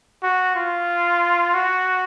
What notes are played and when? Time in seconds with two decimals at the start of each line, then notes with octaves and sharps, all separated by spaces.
0.23 F#4
0.55 F4
1.54 F#4